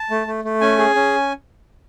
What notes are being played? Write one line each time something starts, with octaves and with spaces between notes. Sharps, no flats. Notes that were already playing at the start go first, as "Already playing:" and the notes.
Already playing: A5
A3
A3
A3
C#4 G#5
G#4
C#4